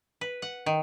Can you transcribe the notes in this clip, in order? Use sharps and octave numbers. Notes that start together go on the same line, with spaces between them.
B4
F#5
D#3